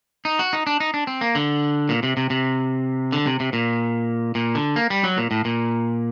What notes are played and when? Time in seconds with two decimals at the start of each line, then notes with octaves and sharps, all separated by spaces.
0.25 D#4
0.39 F#4
0.53 D#4
0.67 D4
0.80 D#4
0.94 D4
1.07 C4
1.21 A#3
1.35 D3
1.89 A#2
2.03 C3
2.17 C3
2.30 C3
3.12 D3
3.26 C3
3.40 C3
3.53 A#2
4.35 A#2
4.55 D3
4.76 A#3
4.90 G3
5.04 F#3
5.17 A#2
5.31 A2
5.45 A#2